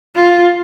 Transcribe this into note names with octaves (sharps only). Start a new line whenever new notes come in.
F4